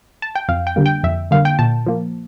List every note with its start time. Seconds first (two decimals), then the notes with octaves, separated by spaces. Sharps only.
0.22 A5
0.35 G5
0.49 F2 F5
0.67 G5
0.76 D3 G3 A#3
0.86 G5
1.04 F2 E5
1.31 D3 G3 A#3 F5
1.45 G5
1.59 A#2 A5
1.86 F3 A#3